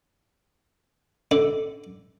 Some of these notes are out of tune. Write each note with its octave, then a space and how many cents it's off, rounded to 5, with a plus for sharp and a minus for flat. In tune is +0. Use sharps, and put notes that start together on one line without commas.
D3 +0 D5 -5